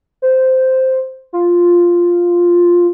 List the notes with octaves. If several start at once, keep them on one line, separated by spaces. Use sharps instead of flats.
C5
F4